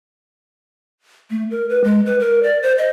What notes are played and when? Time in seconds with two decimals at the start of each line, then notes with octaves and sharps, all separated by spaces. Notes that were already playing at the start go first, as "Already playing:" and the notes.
1.31 A3
1.51 A#4
1.69 B4
1.84 G#3
2.06 B4
2.20 A#4
2.43 D5
2.62 C5
2.78 D#5